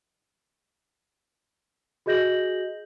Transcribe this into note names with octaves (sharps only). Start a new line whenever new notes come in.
F#4 G#4 D#5 G6 A#6 F#7